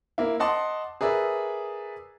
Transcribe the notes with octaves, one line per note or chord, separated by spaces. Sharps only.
A#3 E4
D#5 F#5 A5 C6 D6
G#4 A#4 B4 D5 E5